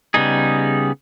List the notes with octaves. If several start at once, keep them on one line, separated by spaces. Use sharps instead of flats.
C#3 G3 B3 D#4 G#4